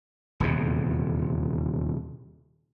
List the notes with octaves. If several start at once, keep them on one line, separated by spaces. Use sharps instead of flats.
D#1 E2 C3